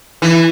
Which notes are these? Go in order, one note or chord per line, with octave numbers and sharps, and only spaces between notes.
E3